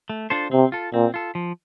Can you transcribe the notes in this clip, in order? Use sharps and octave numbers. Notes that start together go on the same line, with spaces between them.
A3
D4 F4 A4 C5
C3 C4
F4 A4
A#2 C4
F4 A4
F3